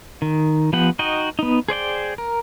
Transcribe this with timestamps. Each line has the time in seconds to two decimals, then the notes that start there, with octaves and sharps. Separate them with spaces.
0.22 D#3
0.73 F3 B3 G4 F#5
0.99 D#4 F#4 D#5 G5
1.39 B3 D#4
1.69 G#4 C5 D5 G5
2.18 A#4